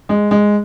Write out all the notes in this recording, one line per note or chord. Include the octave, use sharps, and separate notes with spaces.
G#3
G#3